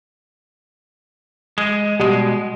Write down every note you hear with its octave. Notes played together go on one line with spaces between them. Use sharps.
G#3
B2 G3 G#3